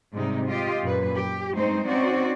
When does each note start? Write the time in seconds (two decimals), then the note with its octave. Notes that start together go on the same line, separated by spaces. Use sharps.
0.13 G#2 C3 G3 D#4
0.48 F4 G4 D#5
0.82 F#2 A#2 B4
1.14 G4
1.54 G2 G#3 A3 C4 D#4 C5
1.87 C4 C#4 D#4 F#4 C5 D5